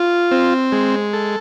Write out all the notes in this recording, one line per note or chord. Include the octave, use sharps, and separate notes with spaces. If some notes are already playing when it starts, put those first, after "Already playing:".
Already playing: F4
C4
G#3
A4